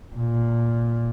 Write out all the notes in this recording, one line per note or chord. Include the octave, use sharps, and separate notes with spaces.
A#2